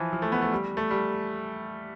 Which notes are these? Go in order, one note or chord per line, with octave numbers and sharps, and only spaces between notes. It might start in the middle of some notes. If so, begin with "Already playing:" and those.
Already playing: E3 F3
F3
A3
B3
A3
G3
A3
G3